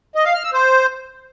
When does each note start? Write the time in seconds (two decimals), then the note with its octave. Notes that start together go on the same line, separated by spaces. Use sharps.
0.15 D#5
0.25 F5
0.34 F6
0.44 E6
0.53 C5